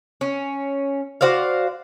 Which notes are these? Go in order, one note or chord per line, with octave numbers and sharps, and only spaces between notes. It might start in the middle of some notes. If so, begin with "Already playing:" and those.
C#4
F#4 C5 D5 F5